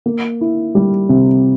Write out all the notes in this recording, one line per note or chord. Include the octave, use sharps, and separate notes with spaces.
A#3
E4
G3
C3